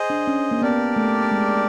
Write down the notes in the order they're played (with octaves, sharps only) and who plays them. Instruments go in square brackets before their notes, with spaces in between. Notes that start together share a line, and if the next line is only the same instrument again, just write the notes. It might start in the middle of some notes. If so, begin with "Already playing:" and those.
Already playing: [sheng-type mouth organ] G#4 C5 D#5
[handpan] D4
C#4
A#3
[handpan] B3 [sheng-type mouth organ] D4 G4 A#4 D5
[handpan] A3
G#3